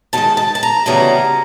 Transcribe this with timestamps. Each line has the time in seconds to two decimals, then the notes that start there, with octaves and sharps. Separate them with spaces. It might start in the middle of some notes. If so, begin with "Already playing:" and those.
0.13 F#2 D#3 G#3 A5
0.37 A5
0.55 A5
0.63 A#5
0.86 D2 C#3 E3 G3 B3 A#5